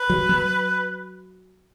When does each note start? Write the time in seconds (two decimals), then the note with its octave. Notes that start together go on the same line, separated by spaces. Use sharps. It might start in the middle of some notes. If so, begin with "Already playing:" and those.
Already playing: B4
0.10 F#3
0.29 F#3